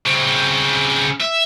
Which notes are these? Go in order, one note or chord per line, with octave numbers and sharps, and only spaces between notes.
C#3 C4
E5